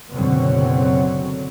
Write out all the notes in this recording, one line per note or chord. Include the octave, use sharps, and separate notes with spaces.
F#1 B2 D3 F#3 C4